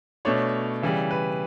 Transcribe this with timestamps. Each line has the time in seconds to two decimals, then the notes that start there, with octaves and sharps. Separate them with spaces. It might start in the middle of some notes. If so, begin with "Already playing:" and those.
0.25 B2 A3 D4 C#5
0.82 C#3 E3 G3
1.11 B4